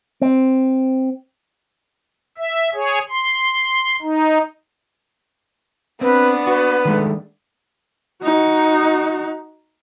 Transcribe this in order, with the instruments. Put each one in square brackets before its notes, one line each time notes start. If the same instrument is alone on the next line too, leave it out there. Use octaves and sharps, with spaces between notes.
[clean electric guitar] C4
[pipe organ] E5
G#4 C#5
C6
D#4
[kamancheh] B3 D4 [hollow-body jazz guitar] C4 [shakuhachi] B4
[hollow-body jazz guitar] F#4 [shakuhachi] B4
[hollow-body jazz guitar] D#3 G#3 A3
[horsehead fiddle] D#4 F#4